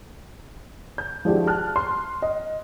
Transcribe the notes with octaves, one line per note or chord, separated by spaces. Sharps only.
G6
F3 G#3 D4 E4 F#4 G4
A5 F6 F#6
C6
D#5